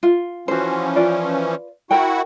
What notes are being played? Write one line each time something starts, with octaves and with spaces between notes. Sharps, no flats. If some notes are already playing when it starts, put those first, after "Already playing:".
F4
E3 F3 C#4 F#4 C5
F4 B4 D5
E4 F#4 A#4 F#5 G5